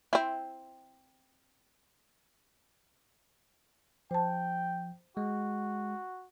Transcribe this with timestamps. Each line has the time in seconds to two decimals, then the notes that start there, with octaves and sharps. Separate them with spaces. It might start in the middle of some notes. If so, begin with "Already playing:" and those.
0.13 C4 E4
4.11 F3 C5 G5 A5
5.17 G#3 F#4